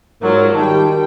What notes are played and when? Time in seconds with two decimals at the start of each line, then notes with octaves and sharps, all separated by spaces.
0.22 G#2 F#3 F4 A#4 D5
0.54 D#3 G3 G5 A5